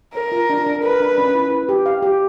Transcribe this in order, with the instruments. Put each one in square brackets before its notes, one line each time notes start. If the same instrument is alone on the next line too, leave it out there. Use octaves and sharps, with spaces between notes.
[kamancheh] A#4 [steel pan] C#5
[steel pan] F4
D4
D4
[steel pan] A#4 [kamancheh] B4
[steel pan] D4
C#4
E4
B4
G4
F5
G4